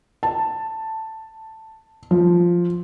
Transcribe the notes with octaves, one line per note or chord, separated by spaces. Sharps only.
A5
F3